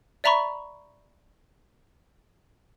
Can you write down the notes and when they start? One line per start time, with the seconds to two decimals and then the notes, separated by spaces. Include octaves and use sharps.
0.24 D5 E5 A#5 B5 C#6